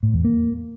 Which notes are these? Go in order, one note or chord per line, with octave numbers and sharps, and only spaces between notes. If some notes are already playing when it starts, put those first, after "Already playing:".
A2
E2
A#3